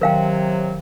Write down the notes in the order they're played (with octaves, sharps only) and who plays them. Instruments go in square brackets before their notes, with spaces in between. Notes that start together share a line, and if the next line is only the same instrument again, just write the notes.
[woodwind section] C3 F#3 [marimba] D#3 [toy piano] A#4 F5 G5